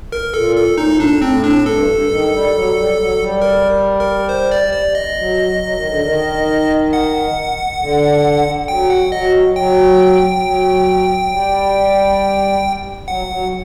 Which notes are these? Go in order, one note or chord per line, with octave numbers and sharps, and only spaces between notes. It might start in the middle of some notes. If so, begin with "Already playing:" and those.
A#4
A#2 A4
A4
A2 D#4
A#2
A2 D4
A2 C4
D4
G2 A4
G2
D#3
G3
F#3
G3
G3
F#3
G3
A#4
A#4
C5
D5
D5
D#5
F#3
F#3
D#3
D3
D#3
F#5
D3
F#3 G5
F#5
F#3 D#5
F#3 G5
F#3
G3
F#3 F#5
F#3